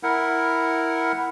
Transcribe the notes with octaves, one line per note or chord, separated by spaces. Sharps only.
E4 A#4 F#5